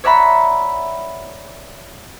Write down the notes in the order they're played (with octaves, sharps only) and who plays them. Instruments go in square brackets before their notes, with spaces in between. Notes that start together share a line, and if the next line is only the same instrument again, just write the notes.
[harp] C#5 D5 E5 F#5 A#5 B5